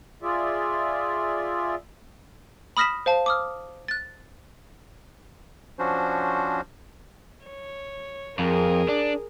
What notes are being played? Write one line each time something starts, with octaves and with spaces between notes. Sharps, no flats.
F4 G#4 D5 E5
B5 D#6 F6 A#6 B6 E7
C5 F5 A5
D6 D#6 F6
F#6 A6
F3 C#4 D4 F#4 C5
C#5
F2 G#4 A#4
D4